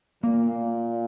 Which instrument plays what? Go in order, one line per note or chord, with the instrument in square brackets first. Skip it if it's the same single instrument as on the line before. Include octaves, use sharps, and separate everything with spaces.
[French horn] A#2 [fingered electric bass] A#3